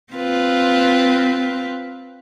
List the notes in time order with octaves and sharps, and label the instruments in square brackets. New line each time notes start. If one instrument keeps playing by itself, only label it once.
[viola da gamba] C4 F4 B4